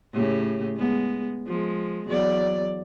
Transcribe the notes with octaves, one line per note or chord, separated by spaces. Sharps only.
A2 C#3 G4
G#3 B3
F3 G#3
E2 F#3 D5